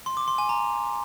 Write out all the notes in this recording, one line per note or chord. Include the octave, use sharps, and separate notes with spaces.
C6
D6
C6
G#5
A#5